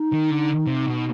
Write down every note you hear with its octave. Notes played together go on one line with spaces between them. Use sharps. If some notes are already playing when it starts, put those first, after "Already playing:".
Already playing: D#4
D#3
D3
C3
B2